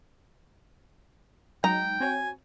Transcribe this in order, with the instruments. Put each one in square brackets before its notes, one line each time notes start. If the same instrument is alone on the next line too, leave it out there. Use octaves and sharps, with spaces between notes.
[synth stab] F#3 G#3 D#4 [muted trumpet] G5 [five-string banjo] A#5
[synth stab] C4 F#4 C#5 [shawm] G#5